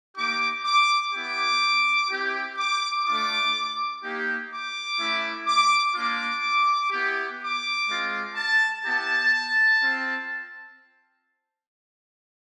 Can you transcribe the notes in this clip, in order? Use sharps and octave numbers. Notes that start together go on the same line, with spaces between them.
A#3 D#4 G4 D6
D6
B3 E4 G4 D6
C4 E4 G4
D6
A3 D4 F4 D6
A#3 D#4 G4
D6
A3 C#4 E4
D6
A#3 D4 F4 D6
B3 E4 G4
D6
G#3 C4 F4
A5
B3 E4 G4 A5
C4 F4